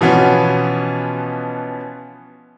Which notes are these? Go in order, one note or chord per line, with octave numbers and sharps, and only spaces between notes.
B2 E3 F3 B3 C#4